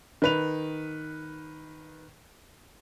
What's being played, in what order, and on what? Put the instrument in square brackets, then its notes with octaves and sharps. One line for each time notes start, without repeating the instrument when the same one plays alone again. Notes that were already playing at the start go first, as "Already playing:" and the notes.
[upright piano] D#3 B4 F7